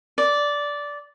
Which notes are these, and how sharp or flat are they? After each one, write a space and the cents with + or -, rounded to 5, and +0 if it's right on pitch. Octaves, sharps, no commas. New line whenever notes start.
D5 -10